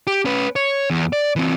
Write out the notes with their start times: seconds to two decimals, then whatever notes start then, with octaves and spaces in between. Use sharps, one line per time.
0.07 G4
0.25 C#4 B4
0.56 C#5
0.90 E2
1.13 D5
1.36 E3 C4